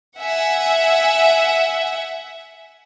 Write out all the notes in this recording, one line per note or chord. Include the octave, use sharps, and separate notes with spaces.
E5 F#5 G#5